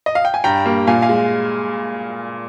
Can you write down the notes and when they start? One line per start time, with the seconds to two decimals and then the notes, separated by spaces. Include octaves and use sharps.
0.06 D#5
0.15 F5
0.25 G5
0.34 G#5
0.44 G2 G5 A#5
0.65 G3 A#3
0.87 A#2 F5 G#5
1.02 F5 G#5
1.09 G#3